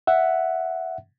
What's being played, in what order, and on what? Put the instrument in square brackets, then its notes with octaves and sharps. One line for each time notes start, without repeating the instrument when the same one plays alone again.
[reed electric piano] E5 F#5